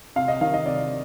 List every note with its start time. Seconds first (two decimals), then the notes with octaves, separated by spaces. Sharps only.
0.16 C3 F5
0.28 D#5
0.41 D#3 F5
0.54 D#5
0.66 C3 D5